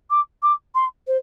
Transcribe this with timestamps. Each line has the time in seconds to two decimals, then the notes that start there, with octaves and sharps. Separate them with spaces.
0.10 D6
0.42 D6
0.74 C6
1.07 C5